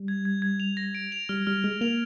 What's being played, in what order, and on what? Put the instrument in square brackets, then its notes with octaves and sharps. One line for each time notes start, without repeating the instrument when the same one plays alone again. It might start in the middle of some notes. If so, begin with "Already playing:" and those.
Already playing: [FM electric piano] G3
[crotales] G#6
G#6
G#6
F7
A#6
D7
F7
[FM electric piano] G3 [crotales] F6
[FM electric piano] G3 [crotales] F6
[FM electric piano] G#3 [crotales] F6
[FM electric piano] A#3 [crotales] F7